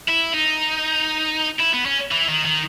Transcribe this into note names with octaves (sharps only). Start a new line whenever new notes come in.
E4
D#4
E4
B3
C#4
E3
D#3
D#3